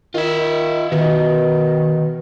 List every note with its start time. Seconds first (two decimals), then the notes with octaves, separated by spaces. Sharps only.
0.14 D#3 F4 E5
0.92 B2 D#3